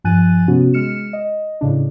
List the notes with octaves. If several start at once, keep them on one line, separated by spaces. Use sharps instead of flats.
G2 F3 G#5 F#6 A6 D#7
C3 B3 C#4 F#4
G#3 F6 C#7 E7
D#5
A2 C#3 D4